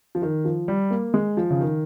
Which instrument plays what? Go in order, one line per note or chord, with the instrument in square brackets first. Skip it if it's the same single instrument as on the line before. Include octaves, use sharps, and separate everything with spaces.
[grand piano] F3
D#3
F3
G3
A#3
G#3
F3
C#3
D#3